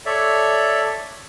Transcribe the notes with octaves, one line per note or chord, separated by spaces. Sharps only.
A4 C#5 D5 E5